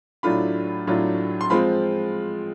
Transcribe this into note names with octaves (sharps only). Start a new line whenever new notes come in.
A2 F#3 A3 D4 F4 B5
A2 F#3 A3 D4 F4
C6
F3 G#3 C4 F4 B5